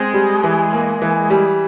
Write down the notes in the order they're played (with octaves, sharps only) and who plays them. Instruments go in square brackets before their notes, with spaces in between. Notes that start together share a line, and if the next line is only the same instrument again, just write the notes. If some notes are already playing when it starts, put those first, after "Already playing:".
Already playing: [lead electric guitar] G#3 [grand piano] C4
[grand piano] G3
E3
A#3
E3
G3